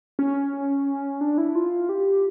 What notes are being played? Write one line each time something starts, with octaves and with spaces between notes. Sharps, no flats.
C#4
D4
E4
F4
G4